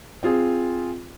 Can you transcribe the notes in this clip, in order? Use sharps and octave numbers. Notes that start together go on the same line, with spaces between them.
C4 F4 G#4